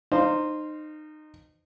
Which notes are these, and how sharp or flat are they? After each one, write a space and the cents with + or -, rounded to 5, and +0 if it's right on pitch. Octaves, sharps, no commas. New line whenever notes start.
D#4 -25 C5 +0 F5 -10